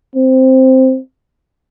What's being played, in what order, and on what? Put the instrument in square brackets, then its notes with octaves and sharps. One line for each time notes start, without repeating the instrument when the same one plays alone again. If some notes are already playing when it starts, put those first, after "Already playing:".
[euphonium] C4